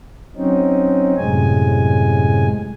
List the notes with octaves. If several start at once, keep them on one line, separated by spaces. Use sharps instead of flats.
F#3 C4 C#4 D#4
F#2 A2 C3 G#3 G#5